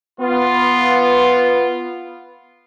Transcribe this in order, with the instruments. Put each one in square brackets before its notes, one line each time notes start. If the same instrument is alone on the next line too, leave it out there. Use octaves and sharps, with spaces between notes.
[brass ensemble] B3 F4